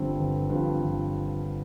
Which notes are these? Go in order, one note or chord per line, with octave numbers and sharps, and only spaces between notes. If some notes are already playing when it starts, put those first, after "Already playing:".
Already playing: G1 G2 F3 C4
G1
G2 F3 C4
G1